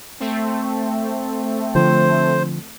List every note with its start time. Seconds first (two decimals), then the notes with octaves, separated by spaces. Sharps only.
0.20 A3 C4
1.75 D3 F3 C5